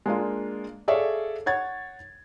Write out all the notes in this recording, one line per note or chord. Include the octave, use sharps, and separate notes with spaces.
G#3 A#3 D4 F4
G#4 A4 C#5 D5 E5 F5
C#5 F#5 G#6 A6